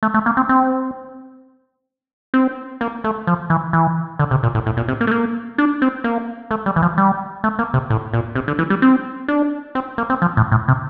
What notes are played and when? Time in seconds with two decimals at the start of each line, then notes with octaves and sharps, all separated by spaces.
0.03 A3
0.14 A3
0.26 A#3
0.37 C4
0.49 C4
2.34 C4
2.81 A#3
3.04 A3
3.27 F3
3.50 E3
3.73 E3
4.19 D3
4.31 C3
4.43 A#2
4.55 A2
4.66 A2
4.77 A#2
4.88 C3
5.01 A#3
5.07 A3
5.11 A#3
5.58 D4
5.82 C4
6.04 A#3
6.51 A3
6.66 G3
6.76 E3
6.82 F3
6.98 G3
7.44 A3
7.59 A#3
7.74 C3
7.90 A2
8.13 A#2
8.35 C3
8.48 D3
8.59 E3
8.70 G3
8.82 C4
9.28 D4
9.75 C4
9.98 A#3
10.10 C4
10.22 F3
10.37 A2
10.52 A2
10.68 C3